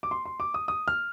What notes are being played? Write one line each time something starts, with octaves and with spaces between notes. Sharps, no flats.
D6
C6
C6
D6
D#6
D#6
F6